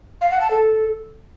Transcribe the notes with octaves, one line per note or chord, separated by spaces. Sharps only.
F5
F#5
A5
A4